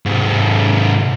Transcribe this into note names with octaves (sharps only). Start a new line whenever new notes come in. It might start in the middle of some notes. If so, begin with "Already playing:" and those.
G#2 C3